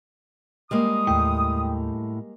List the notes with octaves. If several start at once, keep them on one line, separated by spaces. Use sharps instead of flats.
G3 G#3 A#3 D#6
D#2 A2 G5